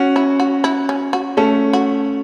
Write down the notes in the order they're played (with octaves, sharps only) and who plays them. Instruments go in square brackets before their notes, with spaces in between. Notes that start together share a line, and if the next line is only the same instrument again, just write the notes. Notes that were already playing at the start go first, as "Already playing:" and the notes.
Already playing: [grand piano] C#4 F#4
[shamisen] E4
F#4
E4
C#4
F#4
[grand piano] A3 C#4 [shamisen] A4
[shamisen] F#4